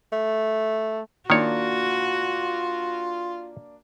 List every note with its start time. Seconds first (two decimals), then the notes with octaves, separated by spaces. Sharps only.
0.12 A3
1.30 D#3 A#3 D4 F4 F#4 C#5